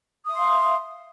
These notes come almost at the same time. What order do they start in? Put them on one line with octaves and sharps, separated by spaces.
D#6 E5 C6 F5